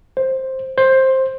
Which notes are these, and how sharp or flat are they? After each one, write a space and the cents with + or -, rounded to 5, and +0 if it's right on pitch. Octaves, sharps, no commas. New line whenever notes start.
C5 +5
C5 +10